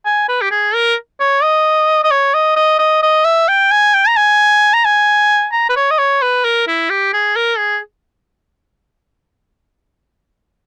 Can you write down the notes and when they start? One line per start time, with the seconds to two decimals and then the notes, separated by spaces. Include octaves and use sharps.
0.06 G#5
0.29 B4
0.42 G4
0.51 G#4
0.74 A#4
1.20 C#5
1.43 D#5
2.04 D#5
2.11 C#5
2.34 D#5
2.56 D#5
2.79 D#5
3.03 D#5
3.25 E5
3.48 G5
3.71 G#5
3.94 G5
4.08 A#5
4.17 G#5
4.73 A#5
4.85 G#5
5.53 A#5
5.69 B4
5.76 C#5
5.91 D#5
5.98 C#5
6.22 B4
6.45 A#4
6.68 E4
6.90 G4
7.13 G#4
7.36 A#4
7.58 G#4